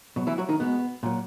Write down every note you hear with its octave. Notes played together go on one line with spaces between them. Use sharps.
B2 F#3
E3 E4
F#3 F#4
D#3 D#4
B2 G#3 B3
A#2 F#3